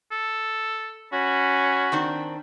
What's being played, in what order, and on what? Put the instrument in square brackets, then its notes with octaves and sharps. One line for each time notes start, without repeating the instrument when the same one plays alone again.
[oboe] A4
[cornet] C#4 [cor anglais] F#4 [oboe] B5
[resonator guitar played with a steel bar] D#3 C4 D4